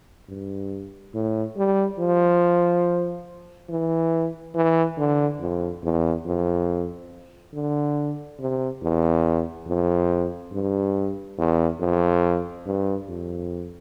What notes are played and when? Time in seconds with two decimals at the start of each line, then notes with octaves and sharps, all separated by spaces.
0.29 G2
1.14 A2
1.57 G3
1.99 F3
3.69 E3
4.55 E3
4.98 D3
5.40 F2
5.83 E2
6.26 F2
7.53 D3
8.39 C3
8.82 E2
9.68 F2
10.53 G2
11.38 E2
11.80 F2
12.66 G2
13.09 F2